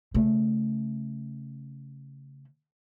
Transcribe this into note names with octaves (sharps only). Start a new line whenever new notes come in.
C#3 A3